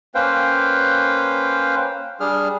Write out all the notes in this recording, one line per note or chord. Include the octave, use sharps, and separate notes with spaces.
A#3 C#4 B4 C5 F5 G5
G3 D4 G#4 F6